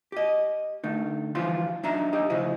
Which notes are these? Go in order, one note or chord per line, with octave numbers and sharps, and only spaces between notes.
G4 D#5
D3 A3 D#4
E3 F3 G3 F4 C6
F#2 D4 D#4 E5 A#5
D#4 G4 D#5
D2 C#3 F3 E4 D#5